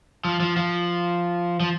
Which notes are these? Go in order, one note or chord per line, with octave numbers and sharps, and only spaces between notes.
F3
F3
F3
F3